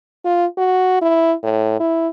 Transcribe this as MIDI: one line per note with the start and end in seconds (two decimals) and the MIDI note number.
0.25 0.46 65
0.58 1.00 66
1.02 1.34 64
1.43 1.75 45
1.80 2.09 64